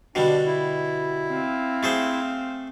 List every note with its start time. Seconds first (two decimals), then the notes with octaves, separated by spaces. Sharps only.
0.15 B2 D3 G3 D4
0.46 E4
1.31 C4 F5
1.83 A3 G#4 C5